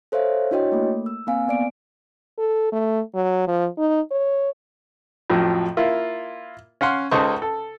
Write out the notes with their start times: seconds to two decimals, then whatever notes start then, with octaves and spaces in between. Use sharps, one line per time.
0.12 A4 C5 C#5 E5 F5
0.51 D4 E4 F#4 C#5 D#5 G5
0.72 A3 A#3
1.06 E6
1.27 A#3 C4 F5 G#5
1.48 B3 D5 D7
2.39 A4
2.72 A3
3.15 F#3
3.48 F3
3.78 D#4
4.11 C#5
5.30 F2 A2 F3 F#3
5.77 A#3 E4 F4
6.81 C#4 F5 F#5 C6
7.11 C#2 C#3 D#4 A4 C5 C#6
7.42 A4